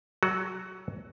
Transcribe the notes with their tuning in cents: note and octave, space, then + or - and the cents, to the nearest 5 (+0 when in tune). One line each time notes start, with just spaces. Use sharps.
F#3 +20 F#4 +0